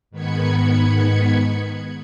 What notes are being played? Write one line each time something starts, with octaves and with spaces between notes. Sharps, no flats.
G#2 D#3 B3 B5 G#6 C#7